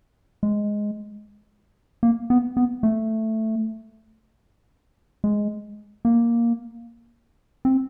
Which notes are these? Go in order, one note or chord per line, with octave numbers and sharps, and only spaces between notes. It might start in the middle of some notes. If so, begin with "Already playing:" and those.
G#3
A#3
B3
B3
A3
G#3
A#3
C4